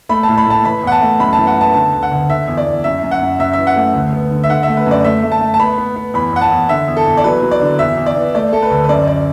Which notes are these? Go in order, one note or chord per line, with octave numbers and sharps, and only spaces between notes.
A3 B5
A5
A2
B5
A2 A5
E3 B5
E2 F#5
A5
A3
F#2 B5
A5
E3
F#5
B3 A5
D3 A5
D2
F#5
D2
D3 E5
E2
D5
E2
F#2 E5
F#2
F#5
F#2
F#2 E5
E3 E5
F#5
A3
D2
B3
D3
E5
D3 F#5
E5
A3
B4
F#2 D5
A3 E5
A3
A5
A3
A5
B3 B5
B3
B3
E2 B5
E2 F#5
A5
E2
D3 E5
E2
A4
E2
D5
F#3 B4
F#3
D5
D3
E2 E5
E2
D5
E3
A3 D5
A3 A4
B4
D2
B4
F#2 D5
D5